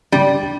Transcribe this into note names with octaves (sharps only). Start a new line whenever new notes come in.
D3 G3